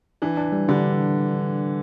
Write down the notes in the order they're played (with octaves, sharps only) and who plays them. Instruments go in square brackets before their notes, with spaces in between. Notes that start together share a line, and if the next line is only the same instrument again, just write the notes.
[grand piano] E3 [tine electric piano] D4
[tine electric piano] D4
G3
[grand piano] D3 [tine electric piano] G3